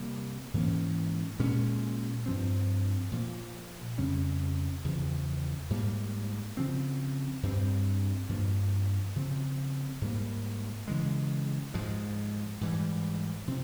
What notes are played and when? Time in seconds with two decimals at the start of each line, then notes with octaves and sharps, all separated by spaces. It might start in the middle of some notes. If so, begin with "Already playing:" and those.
Already playing: C3 G3 A#3
0.54 G#2 E3 A#3 C#4
1.39 A#2 G#3 C#4
2.26 G2 F3 C4
3.11 A#2 F3 A#3
3.98 F2 C#3 G3 C#4
4.84 E2 C#3 F3
5.70 G#2 G3 A#3
6.57 C#3 F3 C4
7.43 G2 G3 C4
8.29 G2 F3 A#3
9.16 C#3 F3 C4
10.01 G#2 G3 A#3
10.88 C#3 E3 G#3
11.74 G#2 F3 G#3
12.61 G#2 E3 G3
13.47 C3 F3 C4